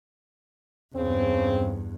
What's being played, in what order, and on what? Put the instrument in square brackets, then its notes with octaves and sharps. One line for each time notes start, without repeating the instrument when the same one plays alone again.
[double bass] E2 G2 [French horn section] C#3 C4